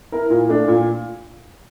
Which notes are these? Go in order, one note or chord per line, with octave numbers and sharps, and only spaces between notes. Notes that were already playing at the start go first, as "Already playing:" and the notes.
E4 A#4
A#2
A3 D4
A#2